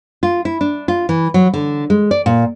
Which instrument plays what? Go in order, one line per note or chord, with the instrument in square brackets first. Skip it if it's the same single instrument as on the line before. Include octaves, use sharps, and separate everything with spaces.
[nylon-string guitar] F4
E4
D4
F4
E3
F#3
D3
G#3
D5
A#2